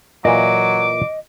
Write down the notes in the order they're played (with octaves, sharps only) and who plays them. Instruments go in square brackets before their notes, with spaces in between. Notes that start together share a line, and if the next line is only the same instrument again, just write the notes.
[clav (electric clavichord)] A#2 E3 [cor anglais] F#3 [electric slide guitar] D#5 [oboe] D6